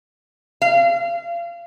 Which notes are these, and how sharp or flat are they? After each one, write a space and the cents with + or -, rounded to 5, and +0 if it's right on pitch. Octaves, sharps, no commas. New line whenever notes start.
F5 -35